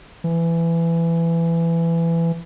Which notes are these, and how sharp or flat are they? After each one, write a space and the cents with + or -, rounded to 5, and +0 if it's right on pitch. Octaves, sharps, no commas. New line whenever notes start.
E3 +20